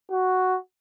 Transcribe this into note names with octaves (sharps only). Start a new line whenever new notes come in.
F#4